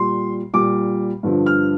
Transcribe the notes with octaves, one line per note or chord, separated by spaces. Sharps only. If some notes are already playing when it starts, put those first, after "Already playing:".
Already playing: A#2 G3 C6
A#2 G3 D6
G2 D3 F3
F6